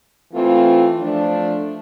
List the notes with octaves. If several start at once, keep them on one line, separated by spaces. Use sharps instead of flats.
E3 A3 C4 F4
F3 A3 D4